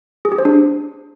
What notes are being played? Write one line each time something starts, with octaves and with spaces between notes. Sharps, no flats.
G#4
G4
C5
D4